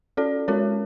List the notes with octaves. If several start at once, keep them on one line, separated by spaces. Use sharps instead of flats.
C#4 F#4 A4 D5
G#3 C#4 F#4 A#4 C#5